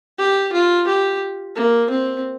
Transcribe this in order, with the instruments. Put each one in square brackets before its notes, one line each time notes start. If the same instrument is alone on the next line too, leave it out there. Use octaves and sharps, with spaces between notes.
[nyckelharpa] G4
F4
G4
A#3
C4